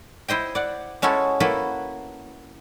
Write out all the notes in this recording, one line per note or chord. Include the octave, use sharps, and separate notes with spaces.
E4 C5 D#5 G5
D5 F#5
G#3 C#4 E4 F#4 A4
A#3 E4 F#4 A4 B4